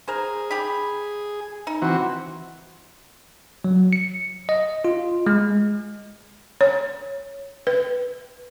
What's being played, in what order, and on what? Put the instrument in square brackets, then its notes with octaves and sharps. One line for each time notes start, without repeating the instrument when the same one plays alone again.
[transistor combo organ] G#4 [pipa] A#4 C5
[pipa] G4 G5 B5
D#4
[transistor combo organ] E3 C4 F#4
[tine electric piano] F#3
C#7
D#5
F4
G#3
[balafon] C#5
B4